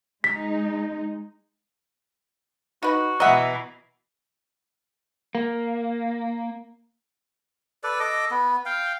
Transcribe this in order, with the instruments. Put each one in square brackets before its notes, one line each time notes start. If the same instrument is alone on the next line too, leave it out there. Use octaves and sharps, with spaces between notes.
[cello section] G#3 D#4 [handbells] B6
[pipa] D#4 B4 [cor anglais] F#4
[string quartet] B2 E3 [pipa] D#5 E5 [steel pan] F#5 A#5
[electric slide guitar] A#3
[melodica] A4 B4 D5
A4 D#5 D6
B3
F5 G5